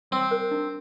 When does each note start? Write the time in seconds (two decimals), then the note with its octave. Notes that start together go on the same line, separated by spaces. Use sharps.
0.11 G3 C4
0.31 A#4
0.51 D4